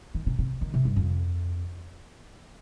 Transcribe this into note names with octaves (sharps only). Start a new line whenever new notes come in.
D#3
C3
C3
D#3
C3
G2
F2